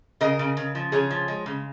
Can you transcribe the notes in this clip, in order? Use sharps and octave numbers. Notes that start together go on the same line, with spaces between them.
C#3 A#4 D#5
C#3
C#3
F3
C#3 G#4 C#5
F3
G#3
C#3